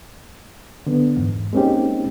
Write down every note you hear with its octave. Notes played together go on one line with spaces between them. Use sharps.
D3 B3
E2 G#2
G#3 A#3 C4 C#4 D#4 G4